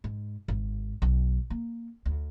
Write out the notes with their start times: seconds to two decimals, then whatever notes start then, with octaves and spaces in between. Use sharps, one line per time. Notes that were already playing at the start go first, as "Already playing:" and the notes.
0.04 G#2
0.48 G#1
1.02 B1
1.50 A#3
2.05 D2